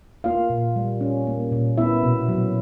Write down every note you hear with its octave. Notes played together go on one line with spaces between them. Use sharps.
A#3 F4 F5
A#2
G3
C#4
A#3
A#2
B3 E4 E5
B2
F#3